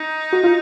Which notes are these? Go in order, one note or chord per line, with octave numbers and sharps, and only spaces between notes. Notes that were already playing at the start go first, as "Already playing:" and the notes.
Already playing: D#4
F#4
F4